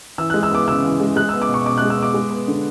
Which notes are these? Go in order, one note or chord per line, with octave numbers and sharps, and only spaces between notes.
E3 E6
F#6
G#3
E6
B3 D6
C#3 E6
E3
G#3
G#3 F#6
E6
B3
D6
B2
C#6
B2 D6
F#6
G#3
E6
B3 D6
G#3
B3
D3